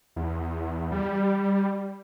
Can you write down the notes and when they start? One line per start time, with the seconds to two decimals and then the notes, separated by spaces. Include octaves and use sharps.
0.16 E2
0.92 G3